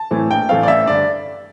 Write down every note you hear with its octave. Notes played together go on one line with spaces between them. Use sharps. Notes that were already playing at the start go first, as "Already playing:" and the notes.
Already playing: A5
A2 E3 A3 C4
A#1 G5
A2 E3 A3 C4 F5
D5
A1 E5
G2 D3 D5